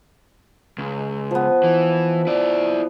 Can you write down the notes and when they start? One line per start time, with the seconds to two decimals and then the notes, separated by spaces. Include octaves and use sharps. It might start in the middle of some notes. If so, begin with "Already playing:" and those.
0.78 C#2
1.31 F3 B3
1.64 E3
2.27 E4 D5